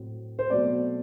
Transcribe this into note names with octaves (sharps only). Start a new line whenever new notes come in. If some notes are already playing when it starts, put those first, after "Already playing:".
Already playing: A2 F#3 C4
C5
B2 F#3 A3 C4 D5